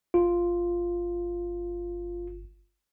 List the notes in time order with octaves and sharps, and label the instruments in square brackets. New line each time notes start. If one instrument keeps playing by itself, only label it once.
[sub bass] G1 [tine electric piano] F4